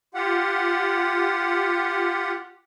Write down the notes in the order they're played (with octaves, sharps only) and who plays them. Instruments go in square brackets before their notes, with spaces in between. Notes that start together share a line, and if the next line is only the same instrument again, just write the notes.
[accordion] F4 G4 F#5